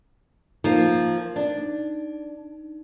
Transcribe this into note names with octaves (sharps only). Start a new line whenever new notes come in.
F3 A#3 D#4
D4